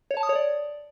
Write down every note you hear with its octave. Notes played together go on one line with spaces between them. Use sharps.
C#5
A5
D#6
C#5
D5